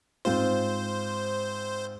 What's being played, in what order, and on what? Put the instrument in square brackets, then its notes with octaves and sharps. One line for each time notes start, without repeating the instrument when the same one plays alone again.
[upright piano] G#2 C4 F4 [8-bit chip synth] C5